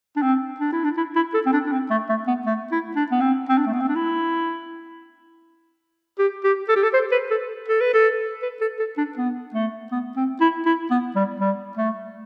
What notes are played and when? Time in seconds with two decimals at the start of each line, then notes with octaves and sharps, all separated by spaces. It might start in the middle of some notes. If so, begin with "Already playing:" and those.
0.16 D4
0.22 C4
0.60 D4
0.72 E4
0.84 D4
0.97 E4
1.16 E4
1.34 A4
1.46 C4
1.53 D4
1.66 D4
1.72 C4
1.91 A3
2.09 A3
2.28 B3
2.46 A3
2.72 E4
2.96 D4
3.11 B3
3.21 C4
3.49 C4
3.58 D4
3.66 A3
3.73 B3
3.80 C4
3.88 D4
3.95 E4
6.19 G4
6.44 G4
6.69 A4
6.76 G4
6.83 A4
6.94 C5
7.12 B4
7.31 A4
7.68 A4
7.81 B4
7.94 A4
8.42 B4
8.61 A4
8.79 A4
8.98 D4
9.17 B3
9.54 A3
9.91 B3
10.16 C4
10.41 E4
10.66 E4
10.91 B3
11.16 G3
11.40 G3
11.78 A3